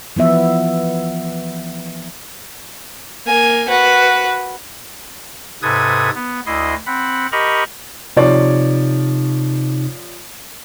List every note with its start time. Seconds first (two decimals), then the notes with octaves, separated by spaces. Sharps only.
0.16 E3 F3 B3 E5
3.25 A#3 G#5
3.68 F#4 B4
5.62 G#2 C3 A4 B4 D#6 G#6
6.15 B3
6.46 D2 E4 D#5 C6
6.86 C4 F#5 B5
7.32 G4 A#4 D#5 A#5 B5 C#6
8.17 C3 F3 D#4 C#5 D5